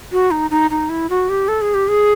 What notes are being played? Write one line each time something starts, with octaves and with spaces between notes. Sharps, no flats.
F#4
D#4
D#4
D#4
E4
F#4
G4
A4
G#4
G4
G#4